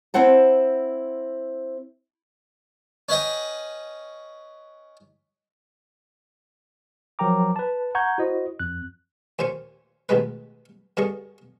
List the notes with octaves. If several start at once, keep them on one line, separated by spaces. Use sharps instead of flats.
C4 E4 C5 F#5 A5
C#4 B4 D#5 G5
F3 F#3 A#4 G5 A#5 D6
B4 A5
F#5 A#5 C#6 G6 G#6
E4 F#4 C5 D#5
F2 F#6
D#2 A#2 C5 G#5 C#6
A1 B2 D#3 G#3 B4
G2 D3 G#4 D#5 C#6